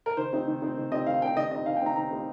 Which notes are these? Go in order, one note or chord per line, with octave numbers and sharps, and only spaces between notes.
A#4
D#3 C5
C4 D#4
D#3
C4 D#4
D#3
C4 D#4 D#5
D#3 F5
C4 D#4 G5
D#3 D#5
C4 D#4 D#5
D#3 F5
G5
C4 D#4 A#5
D#3 A#5
C4 D#4